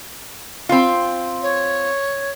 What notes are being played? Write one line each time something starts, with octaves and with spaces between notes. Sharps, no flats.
C4 F4
C#5